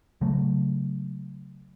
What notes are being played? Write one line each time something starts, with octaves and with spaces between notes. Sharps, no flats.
C#3 F#3 A3